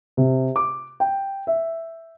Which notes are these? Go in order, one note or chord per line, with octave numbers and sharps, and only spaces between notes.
C3
D6
G5
E5